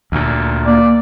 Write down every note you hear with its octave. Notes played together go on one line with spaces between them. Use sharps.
D2 A#2
A#3 D5